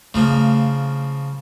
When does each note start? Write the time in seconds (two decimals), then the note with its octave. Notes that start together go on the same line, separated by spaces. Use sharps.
0.14 C#3 F3 A3 A#3